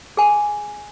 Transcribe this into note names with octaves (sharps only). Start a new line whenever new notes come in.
G#4 G#5